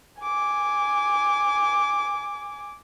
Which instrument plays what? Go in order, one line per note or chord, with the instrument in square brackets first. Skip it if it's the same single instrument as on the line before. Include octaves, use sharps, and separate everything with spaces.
[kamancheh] G#5 D6